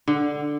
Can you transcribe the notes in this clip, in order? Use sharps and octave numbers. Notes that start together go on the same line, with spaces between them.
D3